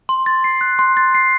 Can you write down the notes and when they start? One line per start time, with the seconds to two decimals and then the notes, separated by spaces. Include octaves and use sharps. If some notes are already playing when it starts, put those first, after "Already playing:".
0.09 C6
0.26 A6
0.44 C7
0.61 F#6
0.79 C6
0.97 A6
1.15 C7